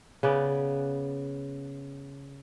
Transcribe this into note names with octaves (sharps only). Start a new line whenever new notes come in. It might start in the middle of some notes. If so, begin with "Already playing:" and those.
C#3 B3 D5